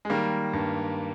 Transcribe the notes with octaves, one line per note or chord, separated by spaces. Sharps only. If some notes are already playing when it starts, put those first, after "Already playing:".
G#3
D#3 G3 A#3
G2